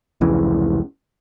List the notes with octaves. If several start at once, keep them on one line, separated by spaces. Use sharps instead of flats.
F1 C#2 C#3 E3